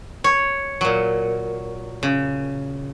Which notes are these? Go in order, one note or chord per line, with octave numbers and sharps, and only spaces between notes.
C#5
A#2 F#3
C#3